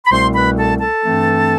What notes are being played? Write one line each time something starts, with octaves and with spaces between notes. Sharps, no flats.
B5
C2 B2 A3 C4 C5 C6
B4 B5
A4 A5
A4 A5
G2 E3 A3 C4